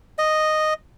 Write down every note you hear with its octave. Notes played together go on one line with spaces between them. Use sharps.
D#5